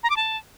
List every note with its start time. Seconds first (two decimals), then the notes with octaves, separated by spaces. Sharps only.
0.03 A#5
0.10 D6
0.17 A5